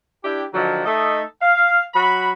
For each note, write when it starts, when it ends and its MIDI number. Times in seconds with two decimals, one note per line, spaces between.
0.23 0.42 62
0.23 0.42 64
0.23 0.42 67
0.54 0.82 50
0.54 0.82 51
0.54 0.82 53
0.54 0.82 54
0.85 1.21 57
0.85 1.21 63
0.85 1.21 69
0.85 1.21 75
0.85 1.21 76
1.42 1.81 77
1.93 2.32 54
1.93 2.32 66
1.93 2.32 83